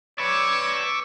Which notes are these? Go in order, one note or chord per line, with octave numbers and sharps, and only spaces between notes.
B4 C#5 D5 C#6 D6 E6